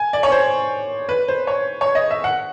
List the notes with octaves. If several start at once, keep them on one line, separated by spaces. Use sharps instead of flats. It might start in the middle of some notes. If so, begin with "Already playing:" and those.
Already playing: G#5
D5
C#5
C5
B4
C5
C#5
C#5
D#5
E5
F#5